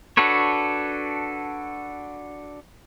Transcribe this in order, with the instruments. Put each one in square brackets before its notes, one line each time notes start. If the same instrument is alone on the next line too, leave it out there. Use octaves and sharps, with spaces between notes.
[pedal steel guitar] D4 F#4 A4 B4 C#5